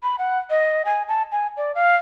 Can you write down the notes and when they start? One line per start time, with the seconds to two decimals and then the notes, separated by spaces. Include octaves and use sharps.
0.03 B5
0.19 F#5
0.50 D#5
0.85 G#5
1.08 A5
1.32 G#5
1.57 D5
1.75 F5